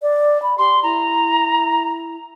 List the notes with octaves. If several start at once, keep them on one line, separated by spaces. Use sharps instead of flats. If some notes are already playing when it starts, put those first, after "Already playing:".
D5
B5
G4 C6
E4 A#5